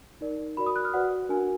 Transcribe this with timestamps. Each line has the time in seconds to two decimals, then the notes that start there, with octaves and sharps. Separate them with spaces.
0.21 D#4 A#4 D5
0.57 F#4 A#4 D5 B5
0.66 D#6
0.76 F#6
0.85 F6
0.94 F#4 B4 D5 F#5
1.29 D4 F#4 A#4 G#5